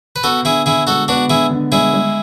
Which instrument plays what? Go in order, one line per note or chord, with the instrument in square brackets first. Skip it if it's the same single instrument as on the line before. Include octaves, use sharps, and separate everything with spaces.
[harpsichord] B4
[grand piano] B3 [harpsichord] F#4 A4
[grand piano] D3 [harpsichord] E4 G#4
[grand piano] D3 [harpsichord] E4 G#4
[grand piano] G#3 [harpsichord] F#4 A4
[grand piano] B3 [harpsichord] D4 F#4
[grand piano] D3 [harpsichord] E4 G#4
[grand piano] D3
[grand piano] G#3 [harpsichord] E4 G#4
[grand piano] G#3